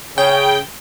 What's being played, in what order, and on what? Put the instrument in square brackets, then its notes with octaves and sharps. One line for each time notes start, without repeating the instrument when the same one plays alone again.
[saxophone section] C#3 [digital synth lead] G5